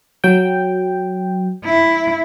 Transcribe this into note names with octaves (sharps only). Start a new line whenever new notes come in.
F#3 G5
E4